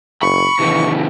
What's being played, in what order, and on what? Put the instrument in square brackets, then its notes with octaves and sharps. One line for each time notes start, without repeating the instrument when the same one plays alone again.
[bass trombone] F#1 [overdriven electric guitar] B5 [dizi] C#6
[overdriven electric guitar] C3 D#3 [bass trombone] E3